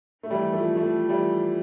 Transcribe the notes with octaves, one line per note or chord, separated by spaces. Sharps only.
A3
E3 G3
F3 A3
F3 A3
E3 G3